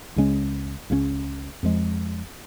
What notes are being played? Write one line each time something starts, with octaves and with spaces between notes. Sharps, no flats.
C#2 C#3 G#3 C#4
C#2 C#3 G#3 C#4
F2 F3 G#3